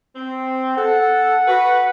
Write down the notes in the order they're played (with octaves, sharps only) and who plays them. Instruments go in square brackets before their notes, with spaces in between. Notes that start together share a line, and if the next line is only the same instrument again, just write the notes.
[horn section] C4
[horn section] A4 [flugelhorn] F#5
[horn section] F#4 B4